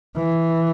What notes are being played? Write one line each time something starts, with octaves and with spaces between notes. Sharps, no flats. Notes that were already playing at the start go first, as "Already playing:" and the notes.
E3